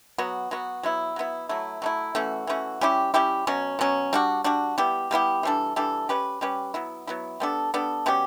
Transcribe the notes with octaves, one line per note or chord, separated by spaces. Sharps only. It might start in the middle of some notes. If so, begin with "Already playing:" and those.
F#3 B3 F#4
F#3 B3 F#4
F#3 B3 E4
F#3 B3 E4
F#3 A3 E4
F#3 A3 E4
E3 A3 C#4 F#4
E3 A3 C#4 F#4
G3 C#4 E4 G4
G3 C#4 E4 G4
B2 F#3 C#4
B2 F#3 C#4
G3 D4 F#4
G3 D4 F#4
G3 B3 E4 G4
G3 B3 E4 G4
E3 G3 D4 A4
E3 G3 D4 A4
G3 C#4 G4 B4
G3 C#4 G4 B4
F#3 B3 E4
F#3 B3 E4
G3 B3 D4 A4
G3 B3 D4 A4
B2 G3 C#4 G4